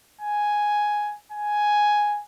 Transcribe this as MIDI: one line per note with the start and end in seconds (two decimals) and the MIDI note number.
0.21 1.14 80
1.32 2.21 80